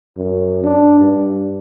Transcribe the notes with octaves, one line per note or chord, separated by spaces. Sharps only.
F#2
D4
G2